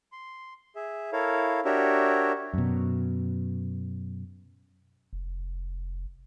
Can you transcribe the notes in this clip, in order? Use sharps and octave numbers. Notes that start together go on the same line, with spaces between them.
C6
G#4 E5
E4 A4 A#4 C#5 F5
D4 F#4 G4 A#4 C#5 E5
F#2 B2
F1